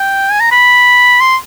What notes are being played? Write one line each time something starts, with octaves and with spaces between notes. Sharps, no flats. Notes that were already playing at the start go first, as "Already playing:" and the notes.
Already playing: G5
G#5
A#5
B5
C6